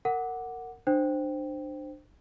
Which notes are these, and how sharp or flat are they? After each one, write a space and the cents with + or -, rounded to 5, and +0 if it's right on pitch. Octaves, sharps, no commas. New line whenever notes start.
A#4 -20 F#5 +0 D6 +0
D4 +30 C5 +0 G5 +0